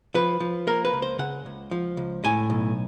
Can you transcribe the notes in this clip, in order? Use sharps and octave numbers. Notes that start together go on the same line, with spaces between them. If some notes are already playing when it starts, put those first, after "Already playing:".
F3 B4
F3
A#3 A#4
B4
C#2
C5
C#3 F#5
C#2
F3
C#2
A2 G#5
B1